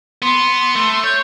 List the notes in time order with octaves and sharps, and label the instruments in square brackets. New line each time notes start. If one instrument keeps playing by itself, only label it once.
[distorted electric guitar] B3 [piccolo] C6
[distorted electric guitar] A3
[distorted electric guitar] C#5 [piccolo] G6